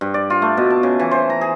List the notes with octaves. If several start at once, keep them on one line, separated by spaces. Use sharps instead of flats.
G2
D5
F4
A3
B2
A5
C#3
E3
C5
A#5
G#4